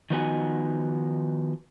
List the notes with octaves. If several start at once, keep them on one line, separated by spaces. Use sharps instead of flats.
D#3 F3 B3 D#4 F#4 G#5